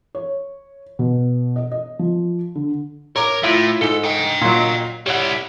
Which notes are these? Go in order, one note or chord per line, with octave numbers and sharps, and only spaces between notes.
C#5
B2
D#5
D#5
F3
D3
A#4 C#5 A#5 D6
A2 E4 F4
G#2 A4
D#5 G5
A#2 F#3
G3 E4 C#5 F#5